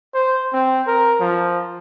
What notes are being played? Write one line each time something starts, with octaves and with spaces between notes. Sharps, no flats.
C5
C4
A#4
F3